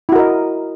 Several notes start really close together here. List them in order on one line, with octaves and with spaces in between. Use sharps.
E4 F#4 A#4 D#5